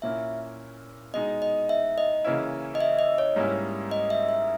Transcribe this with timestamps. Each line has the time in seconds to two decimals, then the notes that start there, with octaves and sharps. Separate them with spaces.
0.02 A#2 A#3 C#4 E4 E5
1.14 B2 G#3 D#4 D#5
1.42 D#5
1.69 E5
1.98 D#5
2.25 C#3 E3 A#3 C#4 E4
2.75 D#5
2.80 E5
2.99 D#5
3.18 C#5
3.36 G#2 G3 A#3 C#4 E4
3.91 D#5
4.10 E5
4.29 E5